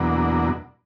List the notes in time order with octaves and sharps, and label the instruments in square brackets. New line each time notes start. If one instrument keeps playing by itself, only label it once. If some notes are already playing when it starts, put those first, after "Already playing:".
Already playing: [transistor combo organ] E2 B2 F#3 A#3 D4